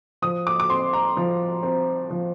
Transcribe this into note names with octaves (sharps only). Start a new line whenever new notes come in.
F3 D#6
D6
D6
C4 C6
A#5
F3
C4
F3